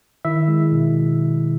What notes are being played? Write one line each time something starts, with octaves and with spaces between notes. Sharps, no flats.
D#3 E4 E5
G#3
B2